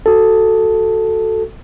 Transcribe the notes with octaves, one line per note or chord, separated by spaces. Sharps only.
F#4 A4